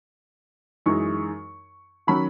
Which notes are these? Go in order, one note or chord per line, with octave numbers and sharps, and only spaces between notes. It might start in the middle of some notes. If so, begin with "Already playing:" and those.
F#2 E3 G#3 D#4 C#6
D#3 F#3 C#4 B5